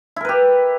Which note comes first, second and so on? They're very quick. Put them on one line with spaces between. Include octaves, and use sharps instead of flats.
E4 A#4 B4 G4